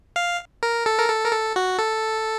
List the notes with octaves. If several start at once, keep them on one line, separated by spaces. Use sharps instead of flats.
F5
A#4
A4
A#4
A4
A#4
A4
F#4
A4